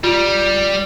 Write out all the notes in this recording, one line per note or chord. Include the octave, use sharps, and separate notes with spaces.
G3 F4